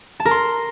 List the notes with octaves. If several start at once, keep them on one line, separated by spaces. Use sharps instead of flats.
A5
A#4
C6